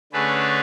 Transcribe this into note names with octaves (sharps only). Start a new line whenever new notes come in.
D3 A3 C#4 G#4 B4